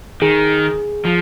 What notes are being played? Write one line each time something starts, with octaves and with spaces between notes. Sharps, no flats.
D#3 G#4
F3